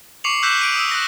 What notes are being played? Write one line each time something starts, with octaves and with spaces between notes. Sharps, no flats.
C#6 D6 C7 C#7 F7 F#7
D6 E6 F#6 G6 B6 E7
D7 D#7
D#6 E6
F#6 A#6